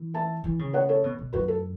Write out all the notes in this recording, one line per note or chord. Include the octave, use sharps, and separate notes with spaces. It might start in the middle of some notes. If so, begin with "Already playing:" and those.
Already playing: E3
E5 A5
E3
C#3
C#5 F#5
A4 C#5
B2
B2
F#2 F#4 B4
A4